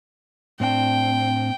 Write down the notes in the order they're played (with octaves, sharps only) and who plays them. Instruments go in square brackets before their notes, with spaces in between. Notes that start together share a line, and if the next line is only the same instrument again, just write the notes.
[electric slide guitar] A2 C4 D4 [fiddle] G5